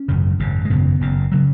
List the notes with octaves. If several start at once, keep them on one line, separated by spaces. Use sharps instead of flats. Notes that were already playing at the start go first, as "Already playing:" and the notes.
Already playing: C#4
G#1 F#2 C#3
G#1 F#2 C#3
G#3
G#1 F#2 C#3 B3
F#1 F#2 C#3
C#3 F#3